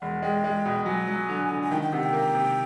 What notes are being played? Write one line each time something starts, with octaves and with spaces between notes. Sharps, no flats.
E1 F#5
G#3 G5
G#3
B2
F#3 G#5
F#3
D3
D3
G#5
D#3 G5
G5
C3 F#5
G5
A#3
C3